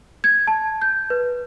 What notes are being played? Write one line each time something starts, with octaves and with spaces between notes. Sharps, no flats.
G#6
A5
G6
B4